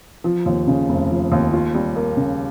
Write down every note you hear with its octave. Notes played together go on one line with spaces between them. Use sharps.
F3
D#2
C#3
F1
F3
D#2
F4
G3
A#3
C#3